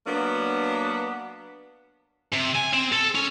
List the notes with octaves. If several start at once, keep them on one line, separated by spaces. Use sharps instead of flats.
F#3 A#3 B3 D4
C3
G#5
C4
A4
C#4